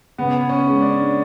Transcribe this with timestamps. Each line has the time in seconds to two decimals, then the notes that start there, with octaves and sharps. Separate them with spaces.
0.18 C#3 B3
0.49 C#4
0.65 G#3 C#4
0.81 D4